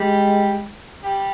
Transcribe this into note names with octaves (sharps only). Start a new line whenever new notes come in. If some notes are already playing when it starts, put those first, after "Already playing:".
Already playing: G3 G#3 G4
G3 G4